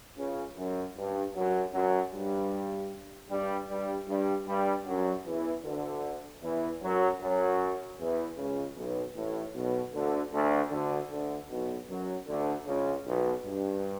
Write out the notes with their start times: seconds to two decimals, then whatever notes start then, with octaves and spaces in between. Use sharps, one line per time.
0.18 C#2 C#3
0.58 F#2
0.97 G2
1.36 F#2 F#3
1.74 F#2 F#3
2.13 G2 G3
3.31 G2 G3
3.69 G2 G3
4.08 G2 G3
4.48 G2 G3
4.86 F#2 F#3
5.25 E2 E3
5.65 D2 D3
6.42 E2 E3
6.82 F#2 F#3
7.21 F#2 F#3
7.99 E2 E3
8.37 C#2 C#3
8.77 B1 B2
9.16 A1 A2
9.54 B1 B2
9.94 D2 D3
10.33 D2 D3
10.72 D2 D3
11.11 D2 D3
11.50 B1 B2
11.90 F#2 F#3
12.28 D2 D3
12.67 C#2 C#3
13.06 B1 B2
13.45 G2